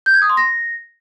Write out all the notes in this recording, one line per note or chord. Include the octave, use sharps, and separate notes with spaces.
G6
G#6
D#6
C6
A#6